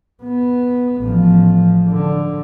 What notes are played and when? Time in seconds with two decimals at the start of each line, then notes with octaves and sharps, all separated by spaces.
0.23 B3
1.02 A1 F3
1.88 D3